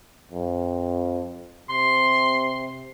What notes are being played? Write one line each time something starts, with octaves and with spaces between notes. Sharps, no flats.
F2
C3 C6